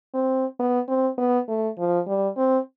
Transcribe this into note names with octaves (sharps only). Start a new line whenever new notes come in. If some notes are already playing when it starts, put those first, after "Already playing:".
C4
B3
C4
B3
A3
F3
G3
C4